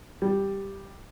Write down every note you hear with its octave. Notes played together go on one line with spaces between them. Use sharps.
G3